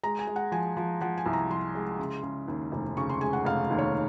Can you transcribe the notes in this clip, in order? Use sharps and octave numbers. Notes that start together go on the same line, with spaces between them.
G#3 A#5
G#5
G#3
F#5
F3 G#5
F3
F3 F#5
G#5
C2
A#5
F3 C6
G#3
C#3
C#3
D#2
F1
C#3 C#6
C6
G#3 G#5
F#5
F1 F5
D#2
C#5